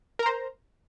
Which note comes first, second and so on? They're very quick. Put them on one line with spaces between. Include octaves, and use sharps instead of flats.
A#4 A#5 C5